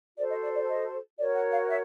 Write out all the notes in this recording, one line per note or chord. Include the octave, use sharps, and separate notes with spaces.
F#4 A4 C5 D5
D#5
D5
D5
D#5
F#4 A#4 C#5 D5
F#5
F5
E5